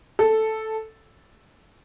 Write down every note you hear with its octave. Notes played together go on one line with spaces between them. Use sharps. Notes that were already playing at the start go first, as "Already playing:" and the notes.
A4